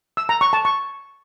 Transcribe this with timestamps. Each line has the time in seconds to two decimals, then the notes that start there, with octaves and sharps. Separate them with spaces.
0.17 E6
0.29 A#5
0.41 C#6
0.53 A5
0.65 C#6